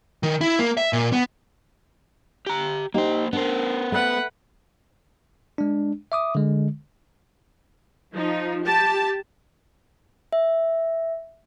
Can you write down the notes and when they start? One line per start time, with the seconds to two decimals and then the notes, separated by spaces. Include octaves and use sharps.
0.23 D#3
0.41 E4
0.59 A#3
0.77 E5
0.93 A#2
1.13 B3
2.47 G4 A#5
2.94 A#3 D#4 G4 C5
3.33 B3 D4 A#4 C5
3.92 A3 B4 F#5
5.58 G#3 D4
6.12 E5 D6 D#6
6.35 D3 G#3
8.14 F3 D#4
8.64 G4 A5
10.33 E5